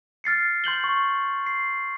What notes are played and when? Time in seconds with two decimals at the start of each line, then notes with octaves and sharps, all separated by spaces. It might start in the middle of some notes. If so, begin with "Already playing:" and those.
0.24 F6 A6 C7 C#7
0.64 C6 G6 F#7 G7
0.84 C#6
1.46 C7